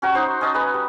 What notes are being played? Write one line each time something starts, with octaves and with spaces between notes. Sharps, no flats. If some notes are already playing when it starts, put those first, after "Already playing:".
C#4 F#4 A#5
D#4 C5
C#4 D#5 A5
B4 G#5 A#5
G3